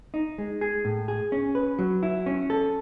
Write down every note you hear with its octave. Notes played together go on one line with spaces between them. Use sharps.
D#4
G#3
G#4
A2
G#4
C#4
B4
F#3
E4
C#4
A4